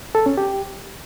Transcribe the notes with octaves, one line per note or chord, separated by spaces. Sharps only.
A4
C#4
G4